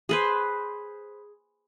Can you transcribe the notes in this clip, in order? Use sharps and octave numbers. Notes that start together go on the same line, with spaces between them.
G#4 B4 C5